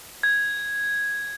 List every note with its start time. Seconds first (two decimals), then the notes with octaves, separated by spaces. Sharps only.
0.23 G#6